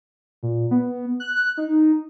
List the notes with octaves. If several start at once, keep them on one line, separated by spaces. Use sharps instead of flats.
A#2
B3
F#6
D#4